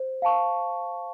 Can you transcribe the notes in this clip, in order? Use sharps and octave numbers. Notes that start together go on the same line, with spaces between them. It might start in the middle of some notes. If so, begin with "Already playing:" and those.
Already playing: C5
F5 A5 C#6